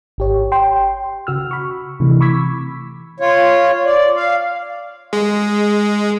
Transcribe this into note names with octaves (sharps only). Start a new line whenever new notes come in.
G#1 G4 C#5
G5 C6
C#3 F#4 E6 F6
B5 C#6
C3 E3 A3
B5 C#6 D6 E6 G#6 B6
F4 C#5
D5
F5
G#3